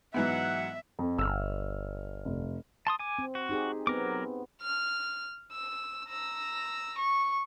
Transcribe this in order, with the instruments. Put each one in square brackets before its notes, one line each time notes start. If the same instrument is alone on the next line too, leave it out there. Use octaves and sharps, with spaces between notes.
[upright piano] G#2 E3 F#3 [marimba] B3 [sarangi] E5 [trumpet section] F#5
[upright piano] F2
[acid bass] G1 [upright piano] E6 F6
[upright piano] F1
[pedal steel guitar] A5 C6 D#6
G#5 D6
[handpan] C4
[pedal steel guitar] F#4
[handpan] D#4 G4 G#4
[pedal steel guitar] F#3 A#4 D6 [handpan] B3 C4
[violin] F6
E6
A#5 E6
C#6